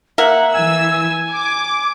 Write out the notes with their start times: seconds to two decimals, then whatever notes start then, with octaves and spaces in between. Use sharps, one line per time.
0.18 A#3 A#4 E5 F#5
0.53 E3 G#5 E6
1.34 D6